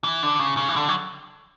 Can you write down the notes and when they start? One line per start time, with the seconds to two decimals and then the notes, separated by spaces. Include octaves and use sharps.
0.04 E3
0.23 D3
0.39 C#3
0.57 C#3
0.69 E3
0.76 D3
0.89 F#3